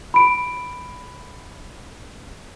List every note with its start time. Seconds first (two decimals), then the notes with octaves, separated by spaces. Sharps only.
0.14 B5 D7